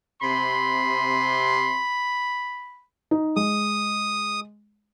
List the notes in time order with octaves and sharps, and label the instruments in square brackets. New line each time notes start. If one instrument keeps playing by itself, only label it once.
[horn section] C3 C6 [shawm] B5
[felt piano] D#4
[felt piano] G#3 [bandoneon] D#6